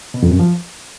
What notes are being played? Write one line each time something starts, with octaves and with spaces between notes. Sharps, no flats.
B2
F2
F#2
F3